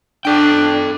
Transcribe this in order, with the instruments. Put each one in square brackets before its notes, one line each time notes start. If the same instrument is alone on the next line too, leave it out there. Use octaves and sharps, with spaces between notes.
[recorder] D4 [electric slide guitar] A4 G5